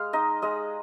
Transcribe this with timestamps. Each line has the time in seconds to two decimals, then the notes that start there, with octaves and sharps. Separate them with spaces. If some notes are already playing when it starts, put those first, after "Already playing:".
Already playing: G#3 F5
0.13 D#4 D#5
0.42 G#3 D#5